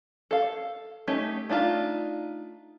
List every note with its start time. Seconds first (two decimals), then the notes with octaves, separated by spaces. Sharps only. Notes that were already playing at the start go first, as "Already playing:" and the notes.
0.31 A4 F5
1.08 A3 C#4 D#4 G4
1.49 A3 D4 D#4 F4